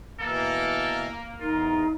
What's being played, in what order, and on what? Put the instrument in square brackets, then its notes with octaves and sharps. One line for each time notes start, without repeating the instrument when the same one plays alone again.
[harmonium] B2 E3 [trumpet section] A#3 [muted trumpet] A4
[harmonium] E2 A#4 [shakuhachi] D#4 [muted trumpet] F4